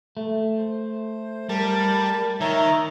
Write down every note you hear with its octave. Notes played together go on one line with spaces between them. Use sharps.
A3
C5
G3 A#4 A5
D#3 C#5 E5 A#5